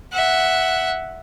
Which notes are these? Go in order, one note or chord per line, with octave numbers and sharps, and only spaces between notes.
E5 F#5